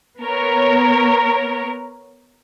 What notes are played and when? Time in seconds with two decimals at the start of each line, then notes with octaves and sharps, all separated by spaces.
0.21 B3 A#4 C#5